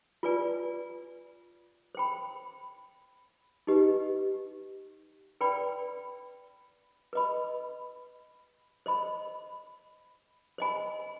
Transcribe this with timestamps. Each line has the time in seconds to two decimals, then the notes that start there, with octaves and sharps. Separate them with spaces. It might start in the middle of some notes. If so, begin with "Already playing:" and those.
0.23 F4 B4 D5 G#5
1.95 C5 G5 B5
3.67 D#4 G4 B4 D#5
5.41 B4 D5 G5 B5
7.13 B4 D#5 B5
8.86 C5 D#5 B5
10.58 C5 D#5 G#5 B5